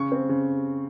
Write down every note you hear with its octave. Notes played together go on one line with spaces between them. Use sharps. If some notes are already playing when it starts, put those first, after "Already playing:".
Already playing: C#3 C#6
C4
C#3